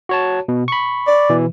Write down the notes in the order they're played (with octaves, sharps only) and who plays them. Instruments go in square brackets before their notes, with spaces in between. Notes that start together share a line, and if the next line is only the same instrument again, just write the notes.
[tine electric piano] F#4 C#5 A5
B2
B5 C#6
[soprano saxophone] D5
[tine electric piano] B2 E3